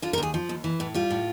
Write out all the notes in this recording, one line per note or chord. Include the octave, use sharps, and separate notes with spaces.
D3 F4
A#4
D#2 G#4
F3
D#2
E3
A2
G3 F4
A2